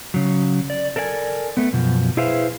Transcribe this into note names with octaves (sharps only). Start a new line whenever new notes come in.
C#3 F#3
D5
A4 A#4 D5 F5 G#5
A3 B3
F#2 B2 F3
E4 G#4 B4 C5 E5 F5